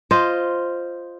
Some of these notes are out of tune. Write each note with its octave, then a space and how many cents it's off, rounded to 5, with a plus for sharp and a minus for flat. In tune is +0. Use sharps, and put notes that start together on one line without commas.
F4 -5 C5 +0 D#5 +0